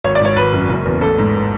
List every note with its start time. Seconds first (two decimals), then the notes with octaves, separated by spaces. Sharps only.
0.04 G#1 C#5
0.15 D5
0.20 G#2 C#5
0.36 G#1 B4
0.53 F#2
0.69 F#1
0.85 E2
1.01 A1 A4
1.18 G#2